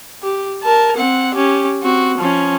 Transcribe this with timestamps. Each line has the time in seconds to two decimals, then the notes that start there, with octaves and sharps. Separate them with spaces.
0.23 G4
0.63 A#4 A5
0.96 C4 F#5
1.34 C#4 G4
1.83 C4 F#4
2.18 F3 C#4